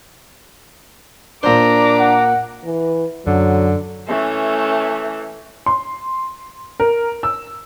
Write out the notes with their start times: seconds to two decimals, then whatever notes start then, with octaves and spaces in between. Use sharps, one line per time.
1.43 A#2 D4 C5 A#5 D6
2.00 F#5
2.65 E3
3.27 F#2 D3 F#3
4.08 E3 A3 C#4
5.66 C6
6.80 A#4
7.23 E6